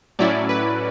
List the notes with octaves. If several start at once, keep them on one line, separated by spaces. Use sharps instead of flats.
A2 F#3 C#4 E4 D5
B4